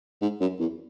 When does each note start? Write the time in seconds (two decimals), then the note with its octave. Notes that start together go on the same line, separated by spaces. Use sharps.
0.22 G#2
0.41 F#2
0.60 E2